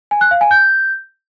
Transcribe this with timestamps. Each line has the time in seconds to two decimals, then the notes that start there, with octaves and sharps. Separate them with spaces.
0.11 G#5
0.21 F#6
0.31 F5
0.41 G#5
0.51 G6